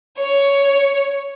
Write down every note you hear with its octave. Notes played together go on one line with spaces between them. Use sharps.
C#5